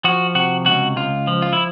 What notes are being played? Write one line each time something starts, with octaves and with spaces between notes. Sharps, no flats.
F3 F#4
C3 F#4
C#2 F#4
C#2 F4
F3
F4
E4